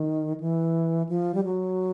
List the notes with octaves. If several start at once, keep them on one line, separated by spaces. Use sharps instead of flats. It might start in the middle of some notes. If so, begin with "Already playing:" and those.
Already playing: D#3
E3
F3
G3
F#3